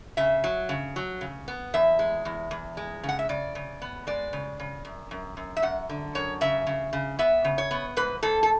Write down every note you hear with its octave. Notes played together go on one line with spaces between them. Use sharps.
C#3 E5
F#3
C#3
F#3
C#3
B3
E2 E5
G#3
E2
E2
G#3
C#3
F#5
E5
C#3 D5
C#3
B3
G#3 D5
C#3
C#3
F#2
F#2
F#2
E5
F#2 F#5
D3
F#2 C#5
C#3 E5
C#3
C#3
B3 E5
C#3
C#5
B3
G#2 B4
G#2 A4
A4